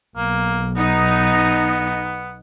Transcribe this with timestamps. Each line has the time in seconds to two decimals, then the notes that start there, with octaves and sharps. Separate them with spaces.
0.17 B1 A#3
0.77 B3 D#4